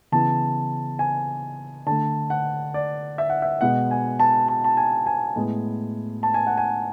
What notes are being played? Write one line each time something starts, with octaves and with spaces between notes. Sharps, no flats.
C#3 E3 B3 A5
G#5
D3 A3 A5
F#5
D5
E5
F#5
E5
B2 G#3 B3 F#5
G#5
A5
A5
A5
G#5
G#5
A2 G#3 B3
A5
G#5
F#5
G#5